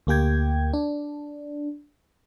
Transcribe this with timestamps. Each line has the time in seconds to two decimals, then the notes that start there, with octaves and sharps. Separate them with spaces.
0.07 D2 A#3 G4 G5 G#6
0.73 D4